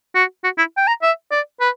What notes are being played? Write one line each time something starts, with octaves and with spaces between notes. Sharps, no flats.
F#4
F#4
E4
G5
A#5
E5
D5
B4